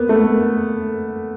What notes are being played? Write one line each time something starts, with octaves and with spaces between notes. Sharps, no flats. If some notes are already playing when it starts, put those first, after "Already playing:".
Already playing: A#3 B3
A3